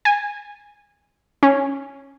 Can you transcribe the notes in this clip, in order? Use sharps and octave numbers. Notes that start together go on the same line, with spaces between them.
G#5
C#4